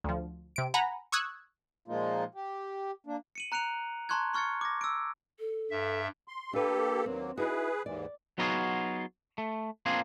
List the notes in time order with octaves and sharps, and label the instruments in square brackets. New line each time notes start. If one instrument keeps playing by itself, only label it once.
[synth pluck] D2 F3
C3 D7
F#5 G#5 A#5 B5
C#6 D#6 E6 F#6 G#6
[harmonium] A#2 F3 G#3 A#3 D#4 F4
G4
A#3 D4
[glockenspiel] C#7 D#7 F#7
A#5 F#6 C#7 D7 F7
A5 A#5 C6 C#6 F#6 G#6
C6 C#6 F6 G#6 A6 C#7
D6 G#6 A#6
E6 D7
[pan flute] A4
[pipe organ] G2 E5
[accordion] C6
[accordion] A#3 G4 A4 [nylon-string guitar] D4 B4
[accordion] D#2 F#3 A#3 [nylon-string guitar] C4
[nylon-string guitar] D#4 E4 F#4 [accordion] G#4 B4
[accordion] D#2 G#2 E3 [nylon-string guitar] D5
[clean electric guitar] F#3 B3 D#4 F4 F#4 G#4
A3
A#3 C4 D4 F4 G#4